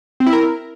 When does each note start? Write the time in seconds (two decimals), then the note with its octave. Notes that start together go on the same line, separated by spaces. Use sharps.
0.20 C4
0.26 E4
0.33 A#4